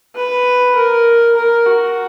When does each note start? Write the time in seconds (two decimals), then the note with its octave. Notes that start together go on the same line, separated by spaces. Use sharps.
0.16 B4
0.76 A#4
1.36 A#4
1.67 F#4